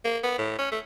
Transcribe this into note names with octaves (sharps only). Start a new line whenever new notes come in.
A#3
B3
A2
C#4
A3